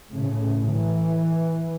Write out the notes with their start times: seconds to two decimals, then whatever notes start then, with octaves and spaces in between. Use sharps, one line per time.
0.11 A2 C#3
0.72 E3